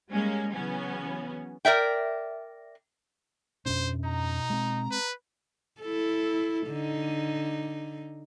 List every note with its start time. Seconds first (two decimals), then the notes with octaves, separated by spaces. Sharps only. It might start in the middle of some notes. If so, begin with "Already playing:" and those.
0.11 G3 G#3 A#3 C#4
0.52 C#3 E3 F#3 B3 C#4
1.65 A#4 D5 E5 G5
3.66 F2 B2 C#4 D4 C5
4.04 D#4 A#5
4.50 G#3 C4
4.91 B4
5.82 E4 A4
6.68 D3 D#4